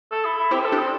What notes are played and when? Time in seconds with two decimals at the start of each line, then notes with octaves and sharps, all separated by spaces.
0.12 A4
0.25 E4
0.38 E4
0.51 C4 E4 G4
0.59 C5
0.65 A4
0.72 D4 G4
0.79 C4